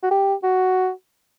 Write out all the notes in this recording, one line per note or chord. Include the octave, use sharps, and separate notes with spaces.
F#4
G4
F#4